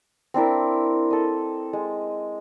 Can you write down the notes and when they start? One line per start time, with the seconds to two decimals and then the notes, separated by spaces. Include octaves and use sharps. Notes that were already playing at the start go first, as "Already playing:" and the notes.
0.34 C4 D4 E4 A#4
1.10 A4 D#5
1.73 G#3